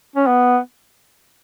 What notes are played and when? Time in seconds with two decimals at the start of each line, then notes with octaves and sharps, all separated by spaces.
0.16 C#4
0.27 B3